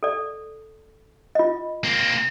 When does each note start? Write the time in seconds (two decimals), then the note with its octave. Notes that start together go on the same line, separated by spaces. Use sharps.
0.03 A4 D5
1.35 F4 D#5
1.84 A#3 C4